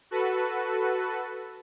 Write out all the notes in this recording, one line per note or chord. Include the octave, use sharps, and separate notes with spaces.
F#4 A4 B4